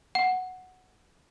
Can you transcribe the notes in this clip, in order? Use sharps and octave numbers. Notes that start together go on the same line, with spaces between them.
F#5